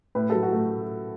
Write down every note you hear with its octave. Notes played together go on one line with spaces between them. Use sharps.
A2 B4
F#3 A4
F#4
A3